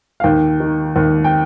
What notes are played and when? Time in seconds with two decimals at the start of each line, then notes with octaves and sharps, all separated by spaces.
0.20 F5
0.24 D#2 G5
0.60 D#3
0.96 D#2
1.24 G5